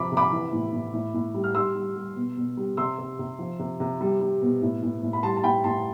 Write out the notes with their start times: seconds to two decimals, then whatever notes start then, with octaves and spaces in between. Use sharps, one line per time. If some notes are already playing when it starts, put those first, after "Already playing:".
Already playing: C3 F3 B5 D6
0.12 C3
0.17 B5 D6
0.32 E3
0.53 A2
0.73 A2
0.94 A2
1.14 A2
1.34 G3
1.44 F6
1.55 G3 C6 E6
1.76 G3
1.96 G3
2.16 B2
2.37 B2
2.57 G3
2.77 C3 C6 E6
2.99 C3
3.19 C3
3.39 F3
3.59 C3
3.80 C3
4.01 G3
4.21 G3
4.42 B2
4.62 A2
4.83 A2
5.03 A2
5.13 B5
5.23 G3 A5 C6
5.37 A5
5.43 A2 G5 B5
5.64 A2 A5 C6